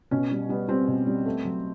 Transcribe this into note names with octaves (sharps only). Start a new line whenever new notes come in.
B2 C#4
G3
G3 B3
G3 C4
B2
G3
A3
F#3